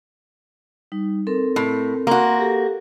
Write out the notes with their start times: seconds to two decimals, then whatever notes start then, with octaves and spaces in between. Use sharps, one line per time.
0.92 G3 D#4
1.27 C4 A4 A#4
1.56 A2
2.07 A#3 F#4 C6
2.39 G4 A4